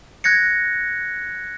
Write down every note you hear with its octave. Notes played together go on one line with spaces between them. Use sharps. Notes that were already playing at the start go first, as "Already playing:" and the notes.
F#6 G#6 A#6 C#7